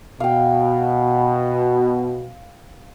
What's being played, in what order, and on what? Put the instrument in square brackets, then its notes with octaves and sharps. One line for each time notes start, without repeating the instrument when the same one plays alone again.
[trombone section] B2 [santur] F5 G5